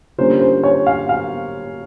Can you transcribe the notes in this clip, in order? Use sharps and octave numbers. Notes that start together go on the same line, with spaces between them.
D3 G3 A#3 C#4 F4 C5
C5
C#5
F5
F5